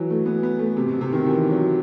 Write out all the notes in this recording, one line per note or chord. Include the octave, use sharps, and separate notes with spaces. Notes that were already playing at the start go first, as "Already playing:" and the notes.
Already playing: E3 F#3
A3
B3
B3
A3
C3
B2
C3
D#3
E3
F#3